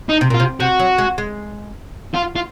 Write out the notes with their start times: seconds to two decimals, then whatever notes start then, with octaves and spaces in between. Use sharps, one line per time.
0.09 D#4
0.21 C3
0.30 A#2
0.34 F4
0.40 C3
0.60 C3 F#4
0.79 F#3
0.98 G#3
1.18 G#3
2.14 F4
2.36 F4